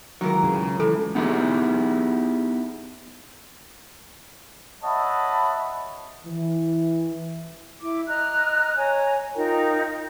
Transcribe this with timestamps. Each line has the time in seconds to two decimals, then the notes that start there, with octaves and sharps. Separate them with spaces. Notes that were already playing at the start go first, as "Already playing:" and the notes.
0.21 C#2 D#3 E3 F#3 A#4
0.44 C#3
0.80 A2 E3 A4
1.15 B3 D#4 E4 G4 G#4
4.84 C#5 D#5 E5 F#5 A5 B5
6.26 E3
7.80 E4 D6
8.07 D#5 A#5 F6 F#6
8.77 C#5 G#5 A#5
9.35 D#4 F4 A#4 G5